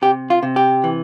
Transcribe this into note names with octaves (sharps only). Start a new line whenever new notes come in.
C3 G4
F4
C3
G4
E3